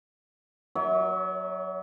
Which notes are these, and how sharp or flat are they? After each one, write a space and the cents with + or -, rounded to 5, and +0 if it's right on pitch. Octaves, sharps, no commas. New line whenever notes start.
F#3 +0 C#5 +40 E5 -35